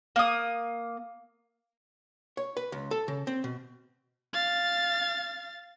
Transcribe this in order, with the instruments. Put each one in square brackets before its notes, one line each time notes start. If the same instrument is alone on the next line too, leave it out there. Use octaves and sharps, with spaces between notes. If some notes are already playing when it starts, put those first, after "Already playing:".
[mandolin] A#3 D#6
[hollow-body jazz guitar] C#5
B4
C#2
A4
C#3
C4
B2
[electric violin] F5 A6